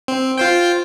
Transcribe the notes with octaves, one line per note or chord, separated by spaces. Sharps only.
C4
F4 C5 G5